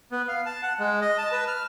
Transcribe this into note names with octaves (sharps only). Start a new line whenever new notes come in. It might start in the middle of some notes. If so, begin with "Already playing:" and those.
B3
F5
A5
F#5
G#3
D#5
A5
B4
F6